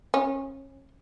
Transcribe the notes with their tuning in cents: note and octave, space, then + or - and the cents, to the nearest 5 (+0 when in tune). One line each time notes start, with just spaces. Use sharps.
C#4 -30